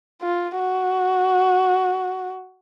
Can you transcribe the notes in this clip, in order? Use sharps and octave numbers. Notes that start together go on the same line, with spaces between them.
F4
F#4